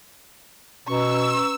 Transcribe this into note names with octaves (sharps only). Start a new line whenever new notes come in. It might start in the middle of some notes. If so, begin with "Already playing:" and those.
B2 C#4 B4 A#5 C#6 E6